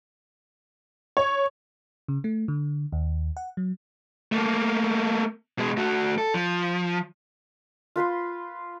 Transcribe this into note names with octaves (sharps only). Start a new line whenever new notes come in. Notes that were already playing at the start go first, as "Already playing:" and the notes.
C#5
C#3
A3
D3
D#2
F#5
F#3
A3 A#3
B2 G#3
A3 F#4
A4
F3
F4 B4 B5 C6